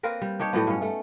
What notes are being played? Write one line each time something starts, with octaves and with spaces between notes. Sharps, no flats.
A#3 C4 A#4 B4
G3
D4 D#4 G4 C#5
A2 F#3 B3
G2 C#4
A3